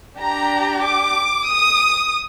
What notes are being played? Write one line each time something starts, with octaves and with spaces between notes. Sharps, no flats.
D4 G4 A#5
D6
D#6